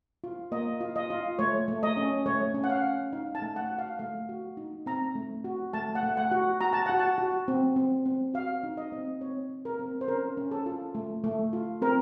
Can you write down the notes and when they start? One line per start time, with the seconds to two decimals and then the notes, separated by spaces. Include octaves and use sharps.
0.24 F4
0.52 A#3 D#5
0.81 F4
0.96 D#5
1.10 F4
1.39 A3 C#5
1.68 A3
1.83 D#5
1.97 C#4
2.26 A3 C#5
2.54 C#4
2.64 F#5
2.70 F5
2.84 C#4
3.13 D#4 F5
3.35 A5
3.42 A3
3.56 F#5
3.71 F#4
3.78 F5
3.99 A3 F5
4.29 F#4
4.57 D#4
4.86 C4 A#5
5.15 A3
5.44 F#4
5.73 A3 A5
5.95 F#5
6.03 A3
6.17 F#5
6.31 F#4
6.61 F#4 A#5
6.73 A5
6.86 F#4 F#5
6.99 A5
7.18 F#4
7.48 C4
7.76 C4
8.05 C4
8.34 F#4 F5
8.64 D#4
8.77 D#5
8.92 C4
9.21 C4 C#5
9.50 C4
9.65 A#4
9.79 C4
10.01 C5
10.08 C#4 A#4
10.37 C#4
10.51 A4
10.66 F4
10.95 A3
11.24 A3
11.53 F4
11.82 C4 A#4